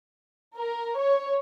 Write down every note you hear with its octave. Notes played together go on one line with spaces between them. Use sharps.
A#4
C#5